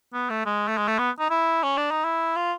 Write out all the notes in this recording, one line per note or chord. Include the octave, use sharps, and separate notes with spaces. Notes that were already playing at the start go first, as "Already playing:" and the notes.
B3
A3
G#3
A3
G#3
A3
B3
D#4
E4
C#4
D4
D#4
E4
F4